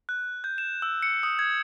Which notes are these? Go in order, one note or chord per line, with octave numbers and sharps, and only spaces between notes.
F#6
G6
E7
E6
C#7
D#6
G#6